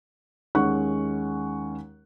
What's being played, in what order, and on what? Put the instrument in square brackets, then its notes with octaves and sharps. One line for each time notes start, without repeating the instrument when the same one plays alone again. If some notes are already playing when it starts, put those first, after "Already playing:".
[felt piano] D#2 G#3 C#4 F#5 C#6 F#6